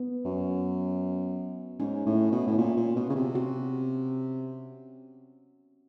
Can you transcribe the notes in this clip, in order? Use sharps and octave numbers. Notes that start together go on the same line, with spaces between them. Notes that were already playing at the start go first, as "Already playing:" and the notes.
Already playing: B3
F#2
G#2 C#4
A2
B2
A2
A#2
A#2
B2
C#3
C3
F#4